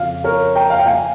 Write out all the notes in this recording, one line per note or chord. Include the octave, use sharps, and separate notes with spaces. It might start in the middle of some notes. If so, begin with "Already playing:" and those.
Already playing: F2 C#3 F3 F5
A#4 C#5
G5 A#5
F5
G5
F5 G#5